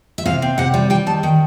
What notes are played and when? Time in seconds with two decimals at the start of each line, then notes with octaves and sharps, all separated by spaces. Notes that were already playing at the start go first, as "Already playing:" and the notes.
0.18 E5
0.26 C3 F5
0.42 C4
0.58 C3 F#5
0.74 G3
0.90 G3 G5
1.06 D#3 A5
1.23 D#3 G5